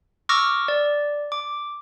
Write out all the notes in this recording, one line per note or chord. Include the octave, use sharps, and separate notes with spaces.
C#6 D6 E6 F6 A#6
D5
D6